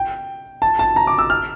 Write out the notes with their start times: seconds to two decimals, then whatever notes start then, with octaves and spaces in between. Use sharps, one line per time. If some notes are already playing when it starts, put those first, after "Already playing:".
Already playing: G5
0.62 A5
0.79 A5
0.96 A#5
1.07 D6
1.19 E6
1.30 F6